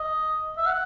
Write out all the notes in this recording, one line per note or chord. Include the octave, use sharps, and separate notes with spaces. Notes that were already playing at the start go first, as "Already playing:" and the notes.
Already playing: D#5
E5
F#5